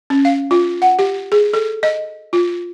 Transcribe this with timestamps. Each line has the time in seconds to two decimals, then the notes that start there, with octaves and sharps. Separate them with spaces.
0.10 C#4
0.25 F5
0.51 F4
0.82 F#5
0.99 G4
1.32 G#4
1.53 A4
1.83 D#5
2.33 F4